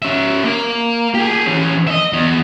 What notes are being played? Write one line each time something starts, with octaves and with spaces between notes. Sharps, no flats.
C#4 E5
A#3
G4 G#4
E3 C#4
D#5 E5
E2